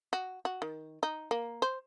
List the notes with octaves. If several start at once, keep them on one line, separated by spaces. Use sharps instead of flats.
F#4
F#4
D#3
D#4
A#3
C5